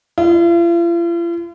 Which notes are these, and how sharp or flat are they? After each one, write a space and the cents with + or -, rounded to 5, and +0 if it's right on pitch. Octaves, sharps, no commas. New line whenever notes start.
F4 -45